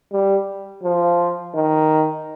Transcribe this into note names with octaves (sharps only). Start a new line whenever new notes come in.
G3
F3
D#3